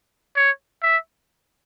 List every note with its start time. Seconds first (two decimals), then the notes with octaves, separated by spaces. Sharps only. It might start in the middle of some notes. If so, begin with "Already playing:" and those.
0.37 C#5
0.83 E5